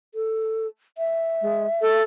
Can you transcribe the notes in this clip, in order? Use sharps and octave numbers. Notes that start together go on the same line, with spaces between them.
A4
E5
G#3
A4